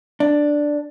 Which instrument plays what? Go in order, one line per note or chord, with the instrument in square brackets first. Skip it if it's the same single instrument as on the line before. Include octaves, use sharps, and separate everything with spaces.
[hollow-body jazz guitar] D4